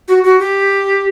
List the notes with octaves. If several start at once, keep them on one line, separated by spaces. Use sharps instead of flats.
F#4
F#4
G4